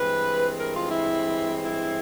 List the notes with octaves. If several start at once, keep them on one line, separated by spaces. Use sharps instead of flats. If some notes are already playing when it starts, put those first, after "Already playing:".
Already playing: G2 E3 G#3 C4 B4
A#4
F4
E4
E4